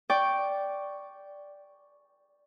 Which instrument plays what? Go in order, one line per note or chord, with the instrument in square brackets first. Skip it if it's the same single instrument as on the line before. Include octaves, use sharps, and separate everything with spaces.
[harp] D5 G5 C#6